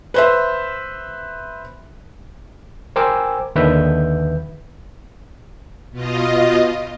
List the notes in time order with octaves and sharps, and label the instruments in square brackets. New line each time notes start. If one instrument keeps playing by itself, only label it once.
[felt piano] B4 C5 E5
[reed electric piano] A#4 C5 G5 G#5 D6 E6
D#2 D3 D#3 B4 E5 G6
[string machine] B2 F4 D#5